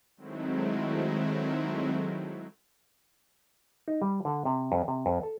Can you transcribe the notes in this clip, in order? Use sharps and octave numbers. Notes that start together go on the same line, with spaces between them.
D#3 F#3 G#3 A3 C4 E4
D#4
G3
D3
C3
F2
C3
F2
A4